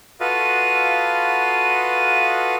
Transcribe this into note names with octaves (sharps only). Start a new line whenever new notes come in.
F4 F#4 A4 B4 D#5 F5